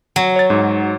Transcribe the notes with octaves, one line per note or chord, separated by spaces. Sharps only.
F#3
C#5 A6
G#2